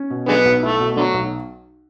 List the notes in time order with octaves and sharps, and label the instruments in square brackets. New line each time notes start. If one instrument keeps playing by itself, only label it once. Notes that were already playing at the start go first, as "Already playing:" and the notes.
Already playing: [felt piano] C#4
B2
[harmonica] D3 G#3 B3 [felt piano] F#3
[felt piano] B1
[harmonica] A3 [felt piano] E4
[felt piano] B2
[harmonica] D3 F#3 [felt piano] A3
[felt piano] B1